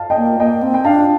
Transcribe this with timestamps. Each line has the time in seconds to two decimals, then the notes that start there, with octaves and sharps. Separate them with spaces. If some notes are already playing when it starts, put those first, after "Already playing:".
Already playing: F5 A5
0.10 D#5 G5
0.17 A#3
0.40 A#3 D#5 G5
0.63 C4
0.74 G5
0.85 D4 F5 A5